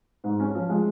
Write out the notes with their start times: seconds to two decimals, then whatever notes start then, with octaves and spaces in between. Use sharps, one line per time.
0.24 G#2
0.40 C#4
0.55 F3
0.69 G#3